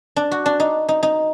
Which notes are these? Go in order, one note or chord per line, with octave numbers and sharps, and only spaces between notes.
D4
F#4
D4
D#4
D#4
D#4